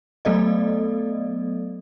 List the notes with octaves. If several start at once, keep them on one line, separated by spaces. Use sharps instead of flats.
F#3 A3 B3 A4 D5 D#5